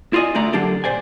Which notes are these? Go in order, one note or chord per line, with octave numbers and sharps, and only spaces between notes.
E4 F4 D5 D#5 G#5
D3 A3 D5 A#5
D3 F#3 A#3 D4 G4 A4
A#2 C5 D5 G#5